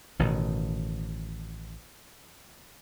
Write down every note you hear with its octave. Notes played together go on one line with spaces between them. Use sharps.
A1 B2 D#3